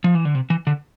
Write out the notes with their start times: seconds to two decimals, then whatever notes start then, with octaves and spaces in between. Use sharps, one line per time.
0.04 F3
0.15 E3
0.25 D3
0.35 C3
0.50 E3
0.67 D3